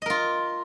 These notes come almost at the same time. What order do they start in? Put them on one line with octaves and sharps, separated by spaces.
D#5 A#4 F4